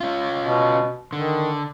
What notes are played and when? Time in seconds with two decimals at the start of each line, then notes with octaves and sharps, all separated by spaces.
0.01 C#4 F4
0.43 B2
1.13 D3 D#3